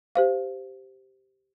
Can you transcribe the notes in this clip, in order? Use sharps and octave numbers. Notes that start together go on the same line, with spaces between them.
G4 C5 F5